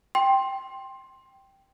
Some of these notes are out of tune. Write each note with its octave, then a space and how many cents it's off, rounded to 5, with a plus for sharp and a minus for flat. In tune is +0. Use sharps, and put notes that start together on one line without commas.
G5 +0 C6 +15